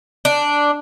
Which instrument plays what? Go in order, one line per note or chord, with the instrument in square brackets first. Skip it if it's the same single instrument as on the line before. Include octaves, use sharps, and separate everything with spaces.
[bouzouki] D4